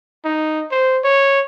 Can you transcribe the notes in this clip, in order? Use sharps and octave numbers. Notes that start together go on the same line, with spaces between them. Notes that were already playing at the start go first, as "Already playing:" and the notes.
D#4
C5
C#5